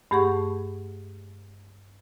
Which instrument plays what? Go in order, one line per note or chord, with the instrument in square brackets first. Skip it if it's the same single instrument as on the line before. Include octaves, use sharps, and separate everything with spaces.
[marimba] G2 A3 G4 G#4 F#5 C#6